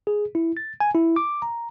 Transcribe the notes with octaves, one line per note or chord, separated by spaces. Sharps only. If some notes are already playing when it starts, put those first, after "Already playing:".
G#4
E4
A6
G#5
E4
D6
A#5